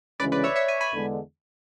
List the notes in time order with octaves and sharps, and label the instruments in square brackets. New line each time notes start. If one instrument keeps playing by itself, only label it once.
[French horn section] D2 C#3 E3 G#3 C#4 [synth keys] B4 D5
[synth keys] B4 D5
C#5 E5
C#5 E5
E5 G#5
G#5 B5
[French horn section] E2 D3 G#3